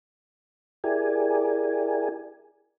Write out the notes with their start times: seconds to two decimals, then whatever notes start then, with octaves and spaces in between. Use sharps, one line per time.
0.84 E4 G4 G#4 A#4 D5 G#5